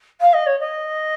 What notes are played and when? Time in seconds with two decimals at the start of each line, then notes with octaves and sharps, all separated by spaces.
0.20 F5
0.33 D#5
0.46 C#5
0.59 D#5